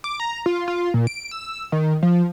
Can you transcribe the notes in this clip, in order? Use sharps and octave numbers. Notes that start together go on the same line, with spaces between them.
D6
A#5
F4
F4
A#2
D7
E6
D#3
F3